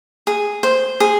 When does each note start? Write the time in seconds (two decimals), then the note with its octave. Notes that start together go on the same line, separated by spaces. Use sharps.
0.27 G#4
0.63 C5
1.00 G#4